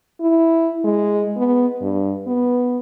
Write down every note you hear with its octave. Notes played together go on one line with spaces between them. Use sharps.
E4
G#3
B3
G2
B3